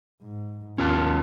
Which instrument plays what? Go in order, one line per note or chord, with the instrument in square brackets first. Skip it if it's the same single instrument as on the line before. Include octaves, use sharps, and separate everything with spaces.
[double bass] G#2
[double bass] D#2 [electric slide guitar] C#4 F4 A5